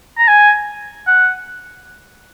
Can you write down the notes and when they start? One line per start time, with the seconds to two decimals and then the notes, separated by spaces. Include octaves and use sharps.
0.18 A#5
0.28 G#5
1.07 F#5